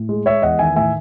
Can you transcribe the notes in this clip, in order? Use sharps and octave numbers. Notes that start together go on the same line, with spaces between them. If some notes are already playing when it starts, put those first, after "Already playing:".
Already playing: A2
G#3
G#3 C#5 E5
E2 D#5 F#5
D#3 E5 G#5
A2 E5 G#5